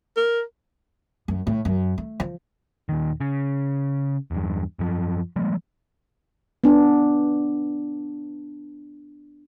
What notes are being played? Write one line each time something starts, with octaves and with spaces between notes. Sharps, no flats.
A#4
F#2
A2
F#2
A3
F3
D#1 D#3
C#3
E2 G2
F#2 F3
F3 G3 G#3 A#3
B3 D4